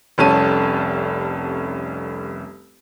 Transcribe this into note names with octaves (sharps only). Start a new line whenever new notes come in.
F1 C2 C#4 A4 A5 D#7